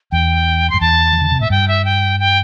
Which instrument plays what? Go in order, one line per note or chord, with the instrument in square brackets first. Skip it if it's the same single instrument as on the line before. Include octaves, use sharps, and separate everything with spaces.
[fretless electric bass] E2 [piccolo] G5
[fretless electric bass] G2 [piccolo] C6
[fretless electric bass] E2 [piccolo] A5
[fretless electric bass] E3
D3
C3
[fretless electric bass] A2 [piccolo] E5
[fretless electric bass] G2 [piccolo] G5
[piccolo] E5
G5
G5